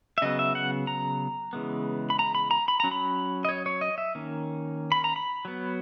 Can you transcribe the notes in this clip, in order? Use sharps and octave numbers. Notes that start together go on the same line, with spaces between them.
E5
C#3 F#3 B3 D#5
E5
F#5
A#5
C#3 E3 G#3 B3
B5
A#5
B5
A#5
B5
F#3 C#4 A#5
B5
D#5
C#5
C#5
D#5
E5
D#3 A#3 C#4
B5
A#5
B5
F#3 B3